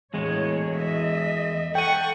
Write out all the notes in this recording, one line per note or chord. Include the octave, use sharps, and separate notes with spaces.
E2 A2 G#3 C#5
D#5 E5
A4 F#5 G5 C#6 D#7